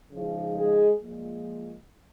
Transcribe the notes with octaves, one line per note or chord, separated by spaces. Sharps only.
C#3 F3 G#3 D#4
G#3 G#4
A#2 F3 G#3